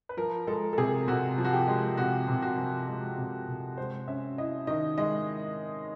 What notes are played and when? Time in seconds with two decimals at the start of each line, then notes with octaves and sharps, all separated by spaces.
0.09 B4
0.17 F3 A#4
0.47 G#3 A4
0.73 A4
0.78 C3 G#4
1.08 C3 F#4
1.38 F3
1.44 F#4
1.53 G4
1.67 G#3
1.97 C3 F#4
2.28 C3
2.42 F#4
2.57 F3
2.88 G#3
3.17 C3
3.48 C3
3.78 G#3 C5
4.08 C#4 E5
4.38 E4 D#5
4.67 D#3 D#5
4.98 G#3 D#5